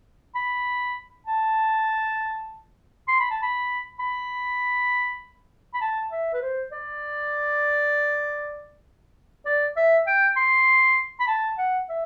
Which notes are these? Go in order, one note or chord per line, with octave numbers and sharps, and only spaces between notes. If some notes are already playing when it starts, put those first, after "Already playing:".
B5
A5
C6
B5
A5
B5
B5
B5
A5
E5
B4
C5
D5
D5
E5
G5
C6
B5
A5
F#5
E5